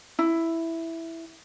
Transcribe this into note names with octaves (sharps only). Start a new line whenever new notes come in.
E4